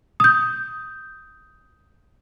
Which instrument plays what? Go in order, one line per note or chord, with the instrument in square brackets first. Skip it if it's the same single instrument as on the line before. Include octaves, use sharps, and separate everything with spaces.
[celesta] D#6 G6